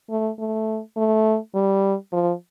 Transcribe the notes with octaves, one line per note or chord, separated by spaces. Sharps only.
A3
A3
A3
G3
F3